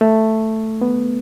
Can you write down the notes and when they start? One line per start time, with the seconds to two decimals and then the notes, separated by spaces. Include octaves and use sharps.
0.01 A3
0.81 B3